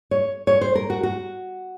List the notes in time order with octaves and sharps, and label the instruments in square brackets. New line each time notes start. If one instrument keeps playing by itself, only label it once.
[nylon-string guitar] C#5
C#5
C5
A#4
F#4
F#4